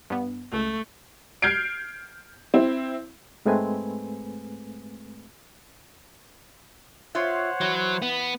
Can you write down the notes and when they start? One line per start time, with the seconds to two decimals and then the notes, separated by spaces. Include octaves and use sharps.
0.10 G2 B3
0.53 C#2 A3
1.42 F6 G6 G#6 C7 D7
2.54 C4 E4
3.45 G#2 G#3 A3 C4 B4 G#5
7.15 F4 C5 C#5 E5 F#5
7.61 E3 F#3
8.02 B3